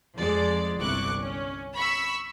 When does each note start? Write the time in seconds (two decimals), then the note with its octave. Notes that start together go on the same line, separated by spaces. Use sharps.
0.16 F2 F3 G#3 D5
0.80 G1 C2 E4 C#6 D6 F#6
1.19 C#4
1.76 B5 C#6 E6 B6